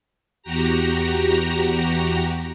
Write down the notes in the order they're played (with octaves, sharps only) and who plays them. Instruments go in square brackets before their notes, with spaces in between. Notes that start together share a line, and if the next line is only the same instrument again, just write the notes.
[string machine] E2 F#4 G4 A#5